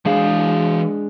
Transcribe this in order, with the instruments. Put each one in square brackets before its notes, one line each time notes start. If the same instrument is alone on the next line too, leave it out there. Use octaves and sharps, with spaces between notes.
[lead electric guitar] E3 F5 [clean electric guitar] G#3 D4 G#4